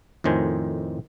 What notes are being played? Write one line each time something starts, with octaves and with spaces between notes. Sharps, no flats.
F2 A2 D#3 C5 G#5